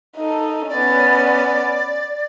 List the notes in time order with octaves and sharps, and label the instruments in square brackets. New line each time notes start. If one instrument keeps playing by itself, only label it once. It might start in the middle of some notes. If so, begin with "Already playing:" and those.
[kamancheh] D#4 A4
[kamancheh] B3 C#4 [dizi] D5